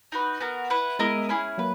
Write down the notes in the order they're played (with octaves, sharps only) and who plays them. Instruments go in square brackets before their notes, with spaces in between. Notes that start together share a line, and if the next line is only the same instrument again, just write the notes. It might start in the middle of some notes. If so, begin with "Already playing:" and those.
[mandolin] D#4 F#4 B4
B3 F#4 A#4
E4 B4 F#5
[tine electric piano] G#3 B3 [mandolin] E4 A#4 D#5
[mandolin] C#4 E4 G#4
[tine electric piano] F#3 A#3 [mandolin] B4